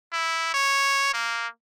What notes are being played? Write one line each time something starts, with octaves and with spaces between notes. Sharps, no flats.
E4
C#5
A#3